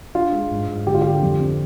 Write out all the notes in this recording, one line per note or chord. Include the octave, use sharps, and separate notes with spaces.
D4 F4
G#3
G#2
G#2
D3 G4
F4
D3 G4
F2
C4